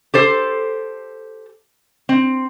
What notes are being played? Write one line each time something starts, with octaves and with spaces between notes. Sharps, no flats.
G4 A4 C5
C4